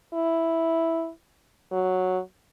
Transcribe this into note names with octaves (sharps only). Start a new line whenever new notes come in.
E4
F#3